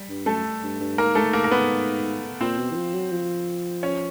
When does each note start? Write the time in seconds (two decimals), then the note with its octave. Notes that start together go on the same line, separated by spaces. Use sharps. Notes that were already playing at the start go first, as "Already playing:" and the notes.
Already playing: G3
0.09 G2
0.26 F#2 A3 A4
0.63 G2
0.79 G2
0.98 G#2 A#3 A#4
1.15 A3 A4
1.33 A#3 A#4
1.44 A#4
1.51 B3 B4
2.41 A#2 C4 C5
2.58 B2
2.71 E3
2.75 F3
2.94 F#3
3.12 F3
3.83 C#4 C#5